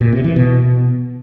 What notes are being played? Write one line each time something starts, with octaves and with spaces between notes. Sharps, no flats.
A#2
C3
E3
B2